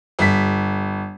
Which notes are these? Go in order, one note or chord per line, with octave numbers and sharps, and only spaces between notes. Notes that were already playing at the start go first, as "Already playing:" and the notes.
G1 B6